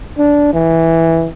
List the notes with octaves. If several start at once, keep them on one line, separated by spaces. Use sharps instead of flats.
D4
E3